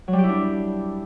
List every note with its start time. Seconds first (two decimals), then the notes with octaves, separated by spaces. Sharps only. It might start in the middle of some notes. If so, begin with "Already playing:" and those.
0.08 F#3
0.13 G3
0.18 G4
0.24 E4
0.29 D4